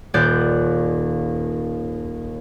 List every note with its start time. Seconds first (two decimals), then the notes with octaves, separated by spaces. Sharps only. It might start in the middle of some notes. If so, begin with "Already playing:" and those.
0.14 D#1 D#2 D5 F#6 G6